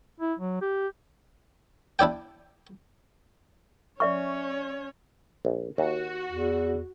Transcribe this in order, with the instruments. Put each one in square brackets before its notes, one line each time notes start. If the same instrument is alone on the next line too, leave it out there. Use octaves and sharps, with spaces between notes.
[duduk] E4
F#3
G4
[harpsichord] D4 E4 D5 G5
[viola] C#4 C#5 [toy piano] D5 E5 C#6
[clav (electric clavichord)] A#1
[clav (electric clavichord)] D#2 [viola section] F#4
[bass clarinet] E2